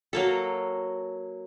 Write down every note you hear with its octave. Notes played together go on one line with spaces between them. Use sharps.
F#3 A#3 A4